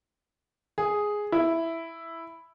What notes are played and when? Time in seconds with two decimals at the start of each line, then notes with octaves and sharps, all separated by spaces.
0.78 G#4
1.32 E4